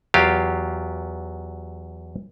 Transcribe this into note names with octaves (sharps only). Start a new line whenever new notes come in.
E2 F#3 F4 G4 F5